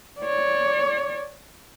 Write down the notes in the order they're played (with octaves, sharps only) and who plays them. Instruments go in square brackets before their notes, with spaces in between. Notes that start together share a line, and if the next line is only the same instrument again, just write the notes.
[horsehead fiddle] C#5 D5